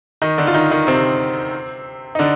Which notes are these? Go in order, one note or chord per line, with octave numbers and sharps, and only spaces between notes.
D#3 D#4
D3 D4
F4
D#3 D#4
D#3 D#4
C3 C4
D#4
D3 D4